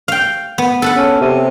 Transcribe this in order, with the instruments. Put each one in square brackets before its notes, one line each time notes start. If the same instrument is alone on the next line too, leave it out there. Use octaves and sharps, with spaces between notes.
[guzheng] F5 G5
B3
A4 B4 F#5
[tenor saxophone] C#4
C3